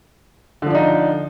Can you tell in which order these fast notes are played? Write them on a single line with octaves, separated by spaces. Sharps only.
D3 F3 D4 D#4